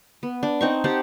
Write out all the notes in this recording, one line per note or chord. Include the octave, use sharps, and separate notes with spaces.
B3
D4
C4 D#4 C#6
G4 C5 F#5 A5